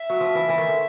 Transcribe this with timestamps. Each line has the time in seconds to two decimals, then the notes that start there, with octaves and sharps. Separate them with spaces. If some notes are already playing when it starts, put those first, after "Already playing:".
Already playing: E5
0.10 F#3
0.21 F3
0.35 E3
0.49 E3
0.58 D#3
0.68 D3